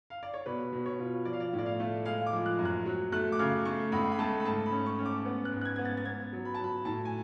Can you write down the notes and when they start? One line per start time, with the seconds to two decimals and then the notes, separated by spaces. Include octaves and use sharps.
0.10 F5
0.23 D5
0.34 C#5
0.46 B2 B4
0.73 B2
0.86 C#5
0.99 F4
1.25 F3 D5
1.33 F5
1.40 D5
1.53 A2
1.58 D5
1.66 F5
1.80 A3
2.05 G#3 F5
2.26 D6
2.33 F3
2.46 F#6
2.59 F#2
2.65 F#6
2.86 F#3
3.12 A3 F#6
3.32 D6
3.39 C#3 F6
3.65 A3 C#6
3.92 C#2 B5
4.12 B5
4.19 A3 A5
4.40 B5
4.45 G#2 A5
4.66 B5
4.72 C#4
4.86 C#6
4.99 C#4
5.05 D6
5.26 B3
5.45 F#6
5.52 G#2
5.61 F#6
5.65 G#6
5.76 B3 G#6
5.85 A6
5.97 A6
6.05 B3 G#6
6.33 F#3
6.45 B5
6.54 A5
6.59 F#3 B5
6.85 A2 A5
7.05 G#5